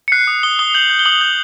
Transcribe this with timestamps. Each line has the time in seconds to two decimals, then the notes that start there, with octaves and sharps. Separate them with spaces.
0.08 C#7
0.12 F#6 C7
0.27 D#6
0.43 D#6 G7
0.59 D#6 G7
0.75 G6 F#7
0.90 G6
0.99 G7
1.05 D#6 F#7
1.21 G6